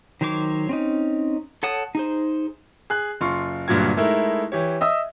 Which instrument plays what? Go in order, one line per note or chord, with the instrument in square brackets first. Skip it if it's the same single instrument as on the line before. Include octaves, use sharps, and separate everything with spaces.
[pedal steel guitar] D#3 F#3 C5 C#5 D6
C4 C#4 D#4
A4 C#5 F#5 A5 D#6
D#4 G#4 C5
[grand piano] G#4 F#6
F#1 F4 C6 C#6
D2 G2 A#2 F#3 F4 G#6
G#3 A3 D#4 E4 A#4
E3 G4 C#5
D#5 E5 D#6 E6